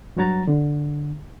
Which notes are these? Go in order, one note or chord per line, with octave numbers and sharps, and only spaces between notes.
G2 F#3 F#4 C#5 A#5 A6
D3